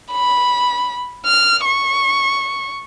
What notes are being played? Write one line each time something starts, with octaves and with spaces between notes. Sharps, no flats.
B5
F6
C#6